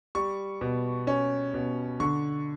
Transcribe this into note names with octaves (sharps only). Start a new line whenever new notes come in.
G3 C#6
B2
C#4
B2
D3 C#6